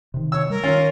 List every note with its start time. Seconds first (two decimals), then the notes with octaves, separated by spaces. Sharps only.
0.14 C3 D#3
0.32 C#5 E6
0.50 G3 A#4
0.64 D#3 C#4 F4